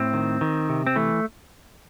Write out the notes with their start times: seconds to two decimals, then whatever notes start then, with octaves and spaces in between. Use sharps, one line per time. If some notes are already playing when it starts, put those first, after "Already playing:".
Already playing: A2 C4
0.13 D#3
0.41 D#3
0.69 C3
0.87 C4
0.96 E3 A3